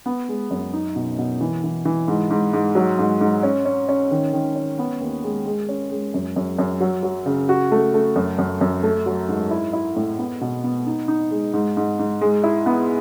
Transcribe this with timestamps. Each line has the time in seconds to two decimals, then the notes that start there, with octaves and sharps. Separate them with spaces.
0.06 B3
0.29 G#3
0.51 F#2
0.73 D#4
0.96 B2
1.18 B2
1.41 E3
1.64 E3
1.85 E3
2.08 G#2
2.31 G#2
2.53 G#2
2.75 F#3
2.99 G#2
3.21 G#2
3.43 C#4
3.65 C#4
3.89 C#4
4.11 D#3
4.33 D#3
4.56 C#4
4.79 B3
5.01 D#2
5.24 G#3
5.45 G#3
5.69 C#4
5.91 G#3
6.14 F#2
6.36 F#2
6.59 F#2
6.81 F#3
7.03 F#3
7.26 C#3
7.49 F#4
7.72 A3
7.94 A3
8.16 F#2
8.38 F#2
8.61 F#2
8.83 A3
9.06 F#3
9.29 G#2
9.51 E4
9.73 E4
9.96 A2
10.18 B3
10.41 B2
10.64 B3
10.87 D#4
11.08 D#4
11.31 G#3
11.53 G#2
11.77 G#2
11.99 G#2
12.21 G#3
12.44 E4
12.66 B3